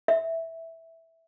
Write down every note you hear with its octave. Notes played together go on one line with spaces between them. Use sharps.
E5